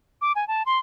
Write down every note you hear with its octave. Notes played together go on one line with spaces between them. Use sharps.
D6
G#5
A5
C6